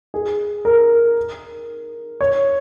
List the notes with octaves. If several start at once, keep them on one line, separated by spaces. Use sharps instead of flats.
G#4
A#4
C#5